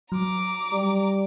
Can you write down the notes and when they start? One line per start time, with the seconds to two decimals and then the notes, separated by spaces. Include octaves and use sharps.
0.12 F#3 A#5 D6
0.73 G3